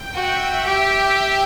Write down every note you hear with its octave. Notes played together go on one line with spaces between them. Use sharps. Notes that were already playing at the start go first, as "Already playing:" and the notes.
Already playing: G5
F#4 E5
G4